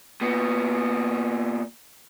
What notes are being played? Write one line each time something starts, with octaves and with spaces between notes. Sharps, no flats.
A#2 B3